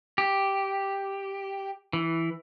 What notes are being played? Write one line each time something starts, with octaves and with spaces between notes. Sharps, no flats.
G4
E3